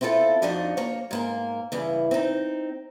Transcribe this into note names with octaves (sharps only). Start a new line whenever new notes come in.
C4 E4 F4 G4 A4
F2 F3 D4 D#4 F#4 D#5
A#3 C#5
G#2 A#3 A#4
G2 C#3 E3
C4 D#4